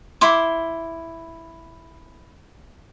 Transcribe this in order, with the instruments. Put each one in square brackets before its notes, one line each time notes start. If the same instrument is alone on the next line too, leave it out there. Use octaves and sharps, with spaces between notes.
[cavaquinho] E4 C6 D6